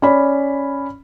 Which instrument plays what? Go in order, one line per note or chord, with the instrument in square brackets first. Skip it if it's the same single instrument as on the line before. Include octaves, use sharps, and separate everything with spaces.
[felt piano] C#4 D5 B5